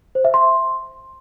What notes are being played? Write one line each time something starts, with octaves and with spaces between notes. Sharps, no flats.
C5
E5
C6